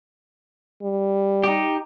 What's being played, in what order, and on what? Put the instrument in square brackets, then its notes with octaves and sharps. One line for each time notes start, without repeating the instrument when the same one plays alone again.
[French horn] G3
[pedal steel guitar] D#4 G4